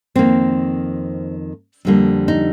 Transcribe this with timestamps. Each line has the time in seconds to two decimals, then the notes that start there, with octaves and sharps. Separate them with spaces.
0.15 F2 D#3 A#3 C4
1.85 F2 D3 G3 A#3
2.28 D#4